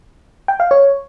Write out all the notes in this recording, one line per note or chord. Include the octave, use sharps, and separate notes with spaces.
G5
F5
C#5